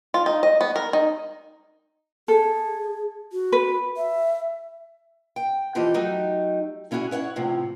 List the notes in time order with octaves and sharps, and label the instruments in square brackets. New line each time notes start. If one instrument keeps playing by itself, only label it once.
[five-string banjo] F4
D#4
D#5
B3
A#4
D#4
[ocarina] G#4 [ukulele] A4
[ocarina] F#4
[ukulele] B4
[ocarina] E5
[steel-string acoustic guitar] G5
E3 F3 G4 A4 D#5
F#3 A3 D#4 G4
D3 C#4 E4 F#4 G#4
E4 C#5 E5 F#5
E2 A2 C3 F3